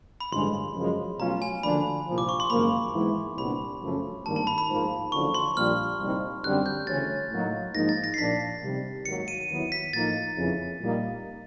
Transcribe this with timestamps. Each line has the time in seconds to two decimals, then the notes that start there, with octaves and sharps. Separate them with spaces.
0.20 B5
0.32 A1 G2 D3 F3 G#3 C6
0.75 F#2 C#3 F3 G#3
1.19 B2 F#3 A3 C#4 F4 A#5
1.42 G#5
1.63 D2 D3 F3 A#3 D4 B5
2.07 C2 A#2 F3
2.18 D6
2.29 C#6
2.40 C6
2.50 G#1 F#2 C#3 F3 A#3 B5
2.93 G#2 E3 G#3 B3 E4
3.37 C2 A#2 G3 B3 D4 B5
3.81 F#2 C#3 F3 A3 C#4
4.26 G#1 G2 D#3 G3 A#3 A5
4.36 A5
4.47 B5
4.58 B5
4.69 G#2 F3 A#3
5.12 F#1 F#2 D3 F3 C#6
5.34 C6
5.56 A#1 A#2 G3 F6
5.99 C2 A#2 G3 C4 D#4
6.44 F#2 D3 G3 C4 F#6
6.66 G6
6.87 D2 C#3 E3 A3 C#4 A6
7.31 A2 F#3 A#3 D#4
7.75 G#2 F3 A#3 D#4 A#6
7.89 A6
8.04 A#6
8.14 C7
8.18 A#1 A#2 F3 A#3 D4 B6
8.62 C3 D#3 G3
9.05 G#1 G#2 D#3 F#3 A#3 C#7
9.28 D#7
9.49 D#2 D#3 F#3 B3 E4
9.72 B6
9.93 A2 F3 A#3 D#4 A6
10.37 F2 C#3 E3
10.81 A#2 G3 A#3 D#4